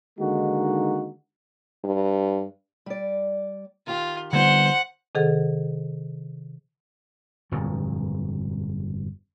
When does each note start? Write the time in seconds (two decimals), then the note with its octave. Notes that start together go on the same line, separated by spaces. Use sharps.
0.19 D3 D#3 G#3 A#3 D#4 F#4
1.85 G2
2.86 G3 D5
3.87 D#3 F4 G4
4.33 F2 D3 G3 B3 D#4 C5 F#5
5.15 C3 D#3 G#4 A4 F#5
7.51 G1 F2 A#2 F3